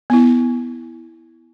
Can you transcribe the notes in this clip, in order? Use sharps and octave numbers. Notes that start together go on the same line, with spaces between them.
B3 E4